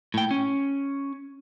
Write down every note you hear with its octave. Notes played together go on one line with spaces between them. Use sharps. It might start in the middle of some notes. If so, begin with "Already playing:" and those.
A2 G5
C#4